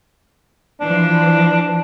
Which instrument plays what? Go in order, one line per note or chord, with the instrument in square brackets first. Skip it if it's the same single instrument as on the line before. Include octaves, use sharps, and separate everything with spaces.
[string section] E3 F3 [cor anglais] D4